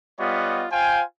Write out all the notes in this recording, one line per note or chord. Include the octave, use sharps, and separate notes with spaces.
G3 B3 F4 C#5 D#5 F#5
F4 C5 F5 G5 G#5